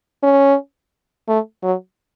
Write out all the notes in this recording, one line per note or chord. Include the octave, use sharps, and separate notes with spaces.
C#4
A3
F#3